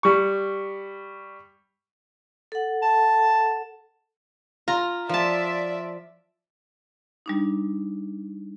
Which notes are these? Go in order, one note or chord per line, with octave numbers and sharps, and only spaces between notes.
G3 C#6
A4 F#5
A5
F4 A#5
F3 D5 E5 A5
G3 D4 D#4